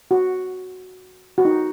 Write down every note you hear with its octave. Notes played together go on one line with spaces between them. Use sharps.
F#4
F#4
D#4